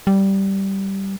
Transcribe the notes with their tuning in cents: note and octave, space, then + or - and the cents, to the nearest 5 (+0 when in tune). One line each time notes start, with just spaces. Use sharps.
G3 -10